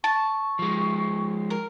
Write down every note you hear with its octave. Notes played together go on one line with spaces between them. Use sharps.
A5 C#6
F3 G#3
A#4